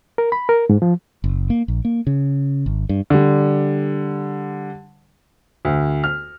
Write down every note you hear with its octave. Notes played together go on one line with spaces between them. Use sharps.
A#4
B5
A#4
G#2
F3
F#1
A#3
A#1
A#3
C#3
G#1
G2
D3 G3
D2
F6